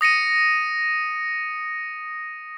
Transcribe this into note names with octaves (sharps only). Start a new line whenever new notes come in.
D#6 A#6 C#7 D#7